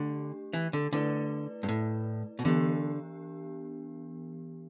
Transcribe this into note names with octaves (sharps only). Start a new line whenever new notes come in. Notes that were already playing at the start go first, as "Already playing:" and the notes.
Already playing: D3 A3 D4 G4
E3
D3
D3 A3 E4 B4 D5
G2
A2
B2
D3 E3 B3 D4 G4